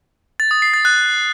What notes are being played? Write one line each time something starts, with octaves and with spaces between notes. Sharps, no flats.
A6
D#6
C7
A6
F#6